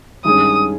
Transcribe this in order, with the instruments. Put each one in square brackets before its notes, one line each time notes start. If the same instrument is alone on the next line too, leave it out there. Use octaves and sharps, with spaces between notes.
[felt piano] G2 D#3 G#3 C#4 G#4 [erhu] D#6